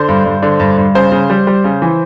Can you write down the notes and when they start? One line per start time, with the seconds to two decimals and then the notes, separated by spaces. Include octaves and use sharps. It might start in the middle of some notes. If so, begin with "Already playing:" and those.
Already playing: D3 C5
0.09 G2
0.25 G2
0.42 D3
0.60 G2
0.77 G2
0.95 C#3 C5
1.12 C#3
1.30 G3
1.47 G3
1.64 C#3
1.82 E3